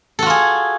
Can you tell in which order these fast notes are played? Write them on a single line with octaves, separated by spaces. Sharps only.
A4 F#4 F4 G#4